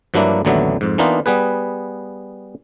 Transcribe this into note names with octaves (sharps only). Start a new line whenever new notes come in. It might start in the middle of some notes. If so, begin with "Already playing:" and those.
G2 F3 F#3 A#3 D4 E4
A1 D#2 D3 F#3 B3 E5
F2 G#2
E3 A#3 B3 D4 D#4 F4
G3 B3 G#4 B4